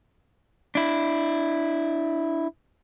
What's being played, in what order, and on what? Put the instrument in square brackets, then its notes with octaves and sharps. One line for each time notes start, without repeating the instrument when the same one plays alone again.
[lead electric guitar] D4 E4